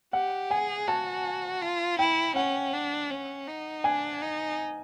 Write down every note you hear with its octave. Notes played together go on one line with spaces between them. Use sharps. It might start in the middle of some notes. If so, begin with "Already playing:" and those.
G4 F#5
G#4 G#5
F#4 A5
F4
E4 G5
C#4 F#5
D4
C#4
D#4
D4 G#5
D#4